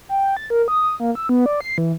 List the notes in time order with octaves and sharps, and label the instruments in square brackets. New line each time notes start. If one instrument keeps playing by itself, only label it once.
[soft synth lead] G5
A6
A#4
D#6
A#3
E6
B3
D5
C7
E3